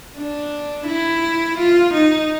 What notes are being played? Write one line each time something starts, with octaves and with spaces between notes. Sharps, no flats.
D4
E4
F4
D#4